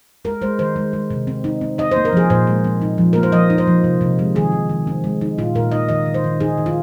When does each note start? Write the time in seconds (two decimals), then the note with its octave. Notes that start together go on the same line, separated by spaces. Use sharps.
0.25 G#3 A#4
0.42 G#3 C5
0.59 D#3 C5
0.76 G#3
0.93 G#3
1.11 C3
1.27 C4
1.44 D#4
1.61 C4
1.78 D#4 D#5
1.91 A#3 C5
2.05 A#4
2.13 F3 G#4
2.30 A#2 C5
2.47 G#3
2.64 C4
2.82 D#4
2.98 F3
3.13 A#3 A#4
3.23 C5
3.32 F3 D#5
3.50 D#4
3.58 C5
3.67 F3
3.84 C3
4.01 C3
4.19 G#3
4.35 D#3 G#4
4.52 D#3
4.69 D#3
4.87 C4
5.04 G#3
5.21 D#4
5.38 A#2 F4
5.55 A#2 A#4
5.72 D#4 D#5
5.89 D#3 D#5
6.06 D#3
6.14 C5
6.24 D#3
6.40 D#4 G#4
6.58 D#3
6.66 F4